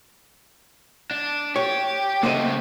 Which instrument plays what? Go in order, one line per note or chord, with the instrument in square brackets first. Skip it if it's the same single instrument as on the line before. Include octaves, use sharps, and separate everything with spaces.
[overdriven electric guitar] D4
[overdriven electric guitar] G4 [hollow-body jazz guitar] C#5
[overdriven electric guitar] C#3 A3 [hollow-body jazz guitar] A#3 C5 D#5